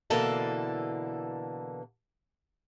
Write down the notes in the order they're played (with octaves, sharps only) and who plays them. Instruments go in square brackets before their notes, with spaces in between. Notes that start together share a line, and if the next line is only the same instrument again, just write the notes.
[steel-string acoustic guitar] B2 D3 E3 A#3 A4